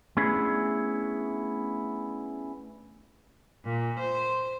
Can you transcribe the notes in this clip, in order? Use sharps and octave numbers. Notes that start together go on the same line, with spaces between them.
A3 B3 C#4 D4 E4 G#4
A#2
C5